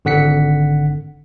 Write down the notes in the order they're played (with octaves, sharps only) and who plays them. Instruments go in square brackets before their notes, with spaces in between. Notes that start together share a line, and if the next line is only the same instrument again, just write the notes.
[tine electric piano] G#1 D3 F#5 B6 C#7